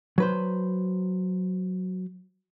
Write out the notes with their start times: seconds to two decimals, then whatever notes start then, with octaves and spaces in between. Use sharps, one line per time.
0.18 F#3 B4 C5